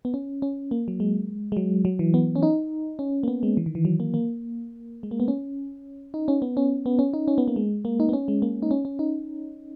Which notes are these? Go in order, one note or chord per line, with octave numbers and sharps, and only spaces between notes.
B3
C#4
C#4
A#3
F#3
G#3
G#3
F#3
F#3
E3
B3
C#4
D#4
C#4
A#3
B3
G#3
E3
D#3
E3
F#3
A#3
A#3
G#3
A#3
B3
C#4
D#4
C#4
B3
C#4
B3
C#4
D#4
C#4
B3
A#3
G#3
A#3
D#4
B3
C#4
G#3
A#3
D#4
C#4
C#4
D#4